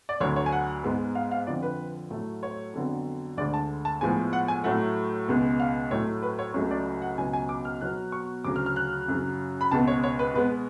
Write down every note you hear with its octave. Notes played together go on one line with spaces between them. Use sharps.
D5
D2 D3 F#3 C#5
C#5
G#5
F#5
G#2 G#3 B3
F5
F5
F2 D3 F3 D5
B4
A2 F#3 A3
C#5
F2 D3 F#3 B3
D2 D3 G#3 D5
A5
A5
A2 F3 G#3 B3 G#5
F#5
G#5
A2 F#3 A3 F#5
C#2 B2 G#3 B3
F5
A2 F#3 A3 C#5
B4
C#5
C#2 C#3 F#3 A3 C#5
D5
F#5
C#2 B2 F#3 B3 G#5
G#5
D6
F6
B2 F#3 B3 F#6
C#6
D2 C#3 F#3 D6
F6
F6
F#6
F#2 C#3 F#3
B5
C#2 B2 G#3 B3 A5
C#5
C#5
B4
B2 G#3 B3 B4